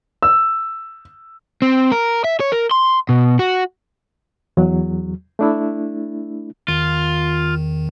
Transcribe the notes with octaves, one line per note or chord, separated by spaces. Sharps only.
E6
C4
A#4
E5
C#5
A#4
C6
B2
F#4
E2 F#3
A3 D4 E4
E2 D#3 F4